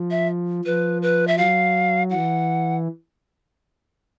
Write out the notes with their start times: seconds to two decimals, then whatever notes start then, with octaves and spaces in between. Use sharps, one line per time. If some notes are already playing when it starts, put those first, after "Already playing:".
Already playing: F3
0.11 E5
0.65 F3 B4
1.02 B4
1.27 E5
1.37 F#3 F5
2.11 E3 F#5